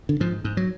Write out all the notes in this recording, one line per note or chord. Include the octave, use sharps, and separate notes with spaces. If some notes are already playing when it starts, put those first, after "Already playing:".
D3
G#2 F3
G#2
F#3